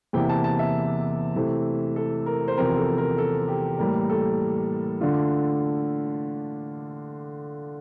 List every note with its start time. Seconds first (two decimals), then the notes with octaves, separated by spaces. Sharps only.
0.13 E2 C3 E3 A#3 E4 G5
0.29 A5
0.44 A5
0.59 E5
1.36 C3 E3 A3
1.96 A4
2.26 A#4
2.48 C5
2.57 E2 C3 F3 C4 A#4
2.77 A4
2.98 A#4
3.18 A4
3.48 G4
3.79 A2 E3 G3 A#3 A#4
4.10 A4
5.01 D3 A3 D4 F4